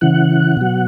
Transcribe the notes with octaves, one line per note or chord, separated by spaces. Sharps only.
C#3 E3 F#5
B2 F#3